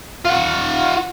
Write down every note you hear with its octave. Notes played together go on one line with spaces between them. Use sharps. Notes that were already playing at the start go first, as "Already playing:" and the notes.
F4 F#5